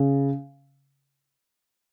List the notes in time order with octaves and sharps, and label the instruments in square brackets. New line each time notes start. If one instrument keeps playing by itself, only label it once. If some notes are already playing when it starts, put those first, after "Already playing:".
Already playing: [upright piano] C#3